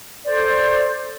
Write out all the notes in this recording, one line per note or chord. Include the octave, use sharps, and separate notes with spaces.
A4 C5 D5